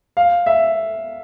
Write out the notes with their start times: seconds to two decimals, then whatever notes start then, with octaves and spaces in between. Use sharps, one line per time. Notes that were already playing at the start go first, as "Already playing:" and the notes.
0.17 F5
0.46 E5